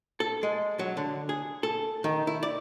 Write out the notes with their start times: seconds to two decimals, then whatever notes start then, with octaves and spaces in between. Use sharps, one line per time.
0.20 A4
0.43 G#3
0.79 F#3
0.97 D3
1.29 G#4
1.63 A4
2.04 D#3
2.27 E4
2.43 D5